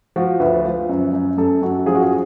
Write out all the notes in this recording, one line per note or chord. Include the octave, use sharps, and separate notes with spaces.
F3 F#4
D2 B4
F3
F#2
F#2
F#2 A4
F#2 F#4
F3 G#4
F#4
G#4